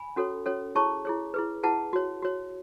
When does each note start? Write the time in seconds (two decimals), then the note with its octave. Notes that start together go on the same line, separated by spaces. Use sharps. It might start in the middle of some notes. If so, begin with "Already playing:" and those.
Already playing: G#5 B5
0.16 C#4 F#4 A4 C#5
0.46 C#4 F#4 A4 C#5
0.75 E4 G#4 C#5 A5 C#6
1.05 E4 G#4 C#5
1.34 E4 G#4 B4
1.63 E4 G#4 B4 F#5 A5
1.93 F#4 C#5
2.22 F#4 C#5